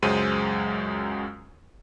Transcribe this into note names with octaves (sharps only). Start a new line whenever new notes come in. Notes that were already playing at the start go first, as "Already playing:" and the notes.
C#2 F#2 F#3 G#3 C5 D#7